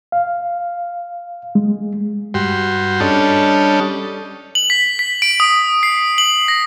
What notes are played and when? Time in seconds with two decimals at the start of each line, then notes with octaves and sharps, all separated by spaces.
0.12 F5
1.55 G#3
2.34 G2 F#4 G4 C6
3.00 G3 C#4 D4 A4 D#5
4.55 F#7
4.70 B6
4.99 B6
5.22 D7
5.40 D#6
5.83 C7
6.18 F#7
6.48 A#6